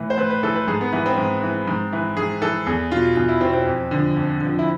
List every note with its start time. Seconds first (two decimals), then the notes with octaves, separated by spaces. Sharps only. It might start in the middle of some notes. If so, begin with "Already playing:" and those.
Already playing: A2 E3
0.10 C5
0.18 A2 B4
0.30 B4
0.43 E3 A4
0.55 B4
0.68 G#2 G#4
0.81 B3
0.93 E3 B3
1.06 C4
1.18 G#2
1.43 E3
1.68 G#2
1.93 E3
2.17 G#2 G#4
2.42 E3 A4
2.66 E2 G#4
2.91 B2 F4
3.16 E2 F4
3.28 E4
3.41 B2 C4
3.54 C4
3.67 F2
3.91 D3 F3
4.16 F2
4.41 D3 F3
4.59 E4